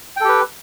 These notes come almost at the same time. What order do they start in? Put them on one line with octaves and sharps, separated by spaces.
G5 A4 G4 B4